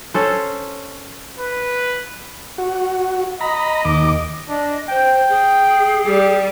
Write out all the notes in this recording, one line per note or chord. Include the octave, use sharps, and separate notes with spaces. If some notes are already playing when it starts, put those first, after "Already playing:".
C#4 A4 C5
B4
F#4
D#5 A#5 B5
D#2 D6
D4 D#5
C5 G5
G#4
G3 G4